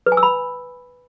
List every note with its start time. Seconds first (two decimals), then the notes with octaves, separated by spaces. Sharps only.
0.06 B4
0.12 G#5
0.17 E6
0.23 B5